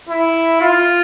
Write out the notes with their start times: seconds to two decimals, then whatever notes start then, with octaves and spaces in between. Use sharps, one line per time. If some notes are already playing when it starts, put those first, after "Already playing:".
0.09 E4
0.61 F4